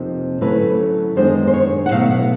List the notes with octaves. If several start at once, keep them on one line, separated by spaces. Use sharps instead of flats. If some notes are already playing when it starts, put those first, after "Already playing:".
Already playing: F2 C3 F3 A#3 D#4
D3 F#3 A3 C#4 E4 B4
F#2 D#3 G#3 B3 D4 C5
C5
C#5
F#5
B2 F#3 A3 F5
F#5